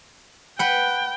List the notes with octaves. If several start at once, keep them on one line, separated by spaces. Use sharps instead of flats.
B4 F#5 G5